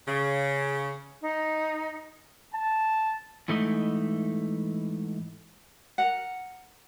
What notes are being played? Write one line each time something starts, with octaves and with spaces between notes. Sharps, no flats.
C#3
D#4
A5
G#2 E3 A3 D#4 E4 D#5
A#4 F#5